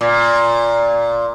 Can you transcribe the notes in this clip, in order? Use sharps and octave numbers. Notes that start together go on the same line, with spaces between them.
A#2